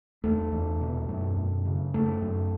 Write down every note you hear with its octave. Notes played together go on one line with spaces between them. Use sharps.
E2 A3
E2
B2
F#2
F#2
C#3
F#2 A3
F#2